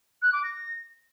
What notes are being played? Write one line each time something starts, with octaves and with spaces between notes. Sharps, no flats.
F#6
D6
A#6